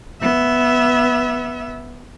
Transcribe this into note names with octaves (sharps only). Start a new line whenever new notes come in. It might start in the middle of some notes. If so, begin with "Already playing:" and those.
B3 E5